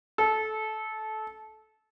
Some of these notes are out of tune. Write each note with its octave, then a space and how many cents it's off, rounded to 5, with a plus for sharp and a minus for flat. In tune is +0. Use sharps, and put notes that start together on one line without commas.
A4 -20